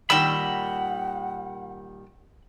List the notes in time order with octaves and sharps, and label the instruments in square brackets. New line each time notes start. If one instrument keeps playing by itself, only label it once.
[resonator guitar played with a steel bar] A#2 D#3 G3 [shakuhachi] F#5 [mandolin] G5 E6 [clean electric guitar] B5